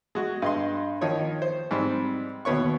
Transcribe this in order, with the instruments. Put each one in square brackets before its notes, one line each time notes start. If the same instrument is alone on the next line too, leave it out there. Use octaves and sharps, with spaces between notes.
[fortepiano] G#3 F#4
G2 D#5 C6
D#3 F3 D#4 C#5
C5
G#2 G3 C4
D#2 B2 B3 C#5 C#6